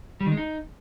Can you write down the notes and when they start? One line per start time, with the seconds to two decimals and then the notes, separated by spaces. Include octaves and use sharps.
0.21 G3
0.26 D#3
0.32 G#3
0.37 D#4